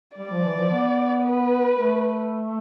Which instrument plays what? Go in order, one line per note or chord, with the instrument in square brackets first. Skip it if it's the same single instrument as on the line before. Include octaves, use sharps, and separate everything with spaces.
[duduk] G3 [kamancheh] D5
[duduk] F3
E3
F3
B3
[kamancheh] B4
[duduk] A3